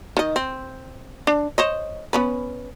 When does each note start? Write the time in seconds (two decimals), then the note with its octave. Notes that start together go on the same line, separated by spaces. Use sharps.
0.17 D#3 D#5
0.36 C4
1.27 D4
1.58 C5 C#5 D#5
2.13 B3 C#4 B4